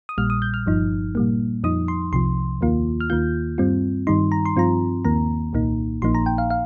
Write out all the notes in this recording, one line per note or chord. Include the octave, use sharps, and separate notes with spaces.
D#6
A#1 A#2 G3 F6
D#6
G6
F6
G1 G2 F3 D#4
A#2 G3 A#3
F2 F3 D#4 D#6
C6
C2 C3 F3 C6
D#2 D#3 A#3 F4
F6
D#2 D#3 A#3 F4 G6
G2 G3 C4 F4
G2 D#3 G3 D#4 C6
A#5
C6
G2 F3 C4 F4 A#5
D#2 D#3 A#3 A#5
C2 A#2 A#3 D#4
A#1 A#2 F3 A#3 D#4 C6
A#5
G5
F5
F5